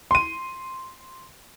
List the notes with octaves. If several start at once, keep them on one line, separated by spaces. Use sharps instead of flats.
C6 D#7